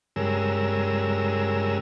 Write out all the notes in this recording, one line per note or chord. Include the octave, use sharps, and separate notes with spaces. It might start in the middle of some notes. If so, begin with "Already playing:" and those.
G2 C#3 G#3 A#4 E6